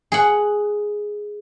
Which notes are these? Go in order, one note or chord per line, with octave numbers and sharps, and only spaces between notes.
G#4 F#5